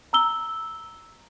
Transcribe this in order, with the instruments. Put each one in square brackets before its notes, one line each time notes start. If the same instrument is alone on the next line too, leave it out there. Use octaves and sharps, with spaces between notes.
[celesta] A#5 E6 G7